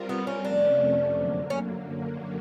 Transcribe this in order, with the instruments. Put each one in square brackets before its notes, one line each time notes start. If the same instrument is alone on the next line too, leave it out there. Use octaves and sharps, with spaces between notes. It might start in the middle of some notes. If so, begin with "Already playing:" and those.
Already playing: [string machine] G3 C4 F4 A#4
[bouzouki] B3
C#4
[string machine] F2 C3 F3 A3 C#4 [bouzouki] D4
[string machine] F#2 D3 F#3 A#3
[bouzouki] C#4